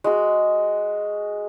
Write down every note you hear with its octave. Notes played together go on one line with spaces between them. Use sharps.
G#3 F#4